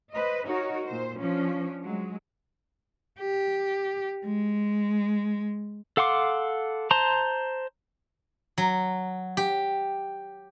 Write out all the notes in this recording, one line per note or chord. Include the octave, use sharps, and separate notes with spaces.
B4 C5 D#5
D#4 F#4 A#4 C#5
A#2 C5
F3 C#4 D4
F#3 G#3
G4
G#3
A4 F5 F#5 C6 D6
C5 A5 A#5 C6
F#3
G4